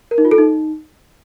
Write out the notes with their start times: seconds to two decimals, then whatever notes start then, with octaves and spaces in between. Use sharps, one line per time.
0.11 A#4
0.18 D#4
0.25 F4
0.31 A4
0.38 D#4